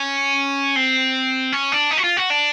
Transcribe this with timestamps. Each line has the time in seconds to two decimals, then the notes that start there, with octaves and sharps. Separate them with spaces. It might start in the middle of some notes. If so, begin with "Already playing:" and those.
Already playing: C#4
0.76 C4
1.52 C#4
1.72 D4
1.91 D#4
1.97 F#4
2.04 F4
2.17 F#4
2.30 D4